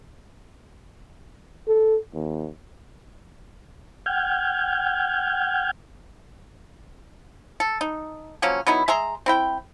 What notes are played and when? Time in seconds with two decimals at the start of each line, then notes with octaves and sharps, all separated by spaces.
1.68 A4
2.14 D#2
4.06 F#5 G5 F6 G6 G#6
7.60 A4
7.81 D#4
8.42 F3 F#3 A#3 C#4
8.67 F#3 B3 D#4 E4
8.88 G#3 E5 A#5 C6
9.26 C4 E4 G5